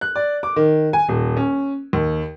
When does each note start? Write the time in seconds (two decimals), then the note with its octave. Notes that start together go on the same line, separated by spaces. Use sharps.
0.01 F#6
0.16 D5
0.43 D6
0.56 D#3
0.93 G#5
1.09 D#1
1.37 C#4
1.93 D#2